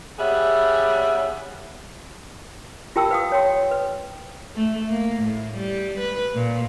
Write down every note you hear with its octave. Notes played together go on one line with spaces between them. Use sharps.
G3 B3 C#4 G#4 E5
F4 G4 A#4 G5 A5 E6
B4 F5 D#6
C#5 G5 C6
B4
A3
A#3
A2
G3
B4
A#2